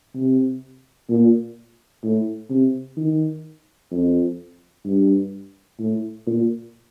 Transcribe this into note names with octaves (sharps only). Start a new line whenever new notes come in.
C3
A#2
A2
C3
D#3
F2
G2
A2
A#2